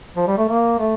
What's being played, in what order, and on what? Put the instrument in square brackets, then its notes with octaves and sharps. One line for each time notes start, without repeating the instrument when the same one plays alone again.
[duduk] F3
G3
A3
A#3
A3